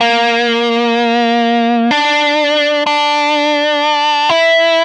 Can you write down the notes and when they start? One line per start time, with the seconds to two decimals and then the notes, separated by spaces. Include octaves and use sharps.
0.01 A#3
1.91 D4
2.87 D4
4.29 E4